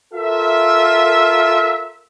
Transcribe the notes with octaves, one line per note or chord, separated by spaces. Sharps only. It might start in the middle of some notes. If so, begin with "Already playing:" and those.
F4 A4 A#4 E5